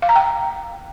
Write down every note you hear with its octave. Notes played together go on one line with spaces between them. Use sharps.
F5
A#5
G5